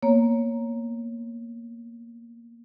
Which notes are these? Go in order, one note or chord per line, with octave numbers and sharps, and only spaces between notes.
A#3 B3 C#5 A#5